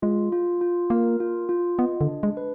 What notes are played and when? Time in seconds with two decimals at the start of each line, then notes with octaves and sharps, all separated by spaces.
0.02 G#3 F4
0.32 F4
0.61 F4
0.90 A#3 A#4
1.20 F4
1.49 F4
1.78 B3 D#5
2.01 D3
2.08 D4
2.23 G#3
2.37 B4